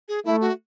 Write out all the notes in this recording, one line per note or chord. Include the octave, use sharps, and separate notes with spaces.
G#4
A3 E4
F#4